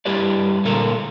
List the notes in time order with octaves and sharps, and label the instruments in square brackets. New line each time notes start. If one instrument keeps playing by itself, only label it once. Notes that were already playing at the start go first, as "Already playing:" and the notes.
[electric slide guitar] G2 G3 E4 G4 B4 D5
A#2 D3 G#3 A4 A#4